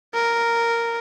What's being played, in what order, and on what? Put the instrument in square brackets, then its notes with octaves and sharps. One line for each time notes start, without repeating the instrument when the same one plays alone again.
[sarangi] A#4